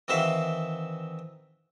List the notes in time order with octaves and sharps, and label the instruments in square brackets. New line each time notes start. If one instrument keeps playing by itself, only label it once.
[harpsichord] D#3 E3 C4 F#4 E5 F5